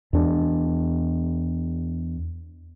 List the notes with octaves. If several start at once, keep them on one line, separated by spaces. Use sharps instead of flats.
E2 D4